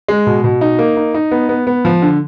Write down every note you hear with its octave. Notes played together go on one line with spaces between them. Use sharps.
G#3
B2
B2
D#4
A#3
D#4
D#4
B3
B3
B3
F3
D3